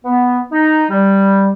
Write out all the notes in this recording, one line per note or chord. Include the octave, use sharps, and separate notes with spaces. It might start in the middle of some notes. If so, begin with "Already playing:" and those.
B3
D#4
G3